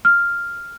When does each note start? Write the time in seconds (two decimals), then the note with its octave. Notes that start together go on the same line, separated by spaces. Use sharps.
0.05 F6